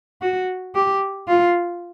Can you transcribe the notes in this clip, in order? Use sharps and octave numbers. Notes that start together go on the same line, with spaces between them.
F#4
G4
F4